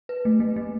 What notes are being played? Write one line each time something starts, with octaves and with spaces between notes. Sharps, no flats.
B4
A3
A3
A3